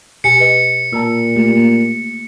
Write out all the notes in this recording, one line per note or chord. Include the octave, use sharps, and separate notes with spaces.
B2 G4 G#5 C#7
B4 D#5
A#2 A5 A#5 E6
A3 F4 G4
A#3